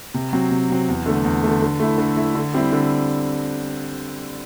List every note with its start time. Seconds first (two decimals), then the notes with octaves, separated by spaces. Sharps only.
0.14 C3
0.33 F#3 C4
0.51 C3
0.69 F#3 C4
0.89 E2
1.06 D3 A3
1.24 E2
1.43 D3 A3
1.62 D3
1.79 A3 E4
1.98 D3
2.17 A3 E4
2.35 D3
2.54 G3 C4 E4
2.72 D3